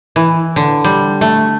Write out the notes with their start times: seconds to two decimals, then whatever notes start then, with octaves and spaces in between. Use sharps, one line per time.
0.16 E3
0.56 D3
0.84 G3
1.21 A3